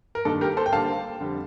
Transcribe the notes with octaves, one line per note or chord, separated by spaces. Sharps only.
A#4
G2 D#3 A#3 D4 A4
G4 A#4
A4 C5
G5
D3 G3 A#3 F5 A5
F2 D3 G3